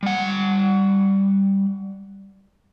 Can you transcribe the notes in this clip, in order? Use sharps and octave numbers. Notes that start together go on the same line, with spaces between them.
G3 F#5